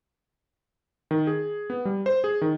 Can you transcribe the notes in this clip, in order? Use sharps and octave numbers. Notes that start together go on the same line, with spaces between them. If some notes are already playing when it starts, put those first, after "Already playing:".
D#3
G#4
B3
G3
C5
G#4
D#3